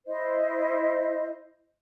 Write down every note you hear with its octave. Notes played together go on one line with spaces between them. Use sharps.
E4 C5 D#5